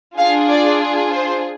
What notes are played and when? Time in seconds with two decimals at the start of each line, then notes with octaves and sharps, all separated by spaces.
0.18 D4 F4 G#4 F5
0.49 D5
1.11 C5